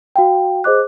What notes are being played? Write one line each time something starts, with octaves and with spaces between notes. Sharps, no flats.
F#4 F5 G5
G#4 C5 D#5 D6 F#6